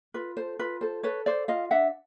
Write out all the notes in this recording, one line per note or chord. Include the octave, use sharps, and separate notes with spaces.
F4 B4
A4 C5
F4 B4
A4 C5
A4 B4 C#5
A4 C5 D5
F4 D#5 F5
D4 E5 F#5